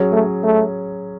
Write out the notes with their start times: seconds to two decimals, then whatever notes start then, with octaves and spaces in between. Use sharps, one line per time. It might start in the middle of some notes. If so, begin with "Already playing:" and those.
Already playing: F#3 C#4 G#4
0.13 A3
0.44 A3